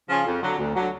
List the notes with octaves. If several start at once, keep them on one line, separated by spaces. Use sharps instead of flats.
C#3 F3 C#4 F4
F2
D3 F#3
D2
D3 F#3